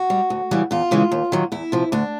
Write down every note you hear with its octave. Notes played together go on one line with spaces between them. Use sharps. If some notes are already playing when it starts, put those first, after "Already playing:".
Already playing: F#4
G3
D2
C#3 E3 G3
E2 F4
C#3 E3 G#3
D#2
D#3 F#3
E2 E4
C3 F3
D2 D4